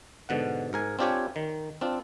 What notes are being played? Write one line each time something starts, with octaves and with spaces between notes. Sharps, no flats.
G#2 B2 D3 F#5
G#2 A#4 G#5
C4 D4 F4 G4 C#5 G#5
D#3
C4 D4 F4